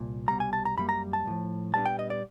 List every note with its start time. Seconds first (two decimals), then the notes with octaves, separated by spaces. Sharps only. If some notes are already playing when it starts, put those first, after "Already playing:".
Already playing: C2 A#2
0.28 C2 B2 G3 A#5
0.40 G#5
0.53 A5
0.65 A#5
0.77 F#2 D#3 G3 A#3 B5
0.89 A#5
1.13 A5
1.26 B1 A2 F3
1.74 A#2 G3 B3 D4 A5
1.86 G5
1.99 D#5
2.10 D5